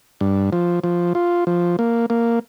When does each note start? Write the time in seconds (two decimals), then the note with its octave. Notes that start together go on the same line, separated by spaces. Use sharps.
0.21 G2
0.53 F3
0.84 F3
1.15 F4
1.47 F3
1.79 A#3
2.10 A#3